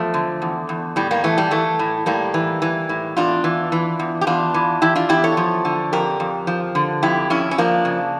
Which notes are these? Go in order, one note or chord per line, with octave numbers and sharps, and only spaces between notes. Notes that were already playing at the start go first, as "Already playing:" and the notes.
Already playing: E2 F3 A3
D3
E2
E2
A2 G3
G3 A#3
E3 A3
G3
E3 A3
A2
A2 G3 A#3
E3
E3
A2
E2 D4 F4
E3
E3
E2
G4
E2 D4 F4
E3
E3 E4 G4
D4 F4
E2 E4 G4
A4 C#5
F3
D3
F2 G4 A#4
F2
F3
D3
F2 E4 G4
F2 C#4 E4
C#4
F3 A#3 D4
C#3